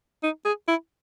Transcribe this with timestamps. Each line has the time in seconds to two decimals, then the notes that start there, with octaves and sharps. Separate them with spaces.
0.23 D#4
0.45 G#4
0.68 E4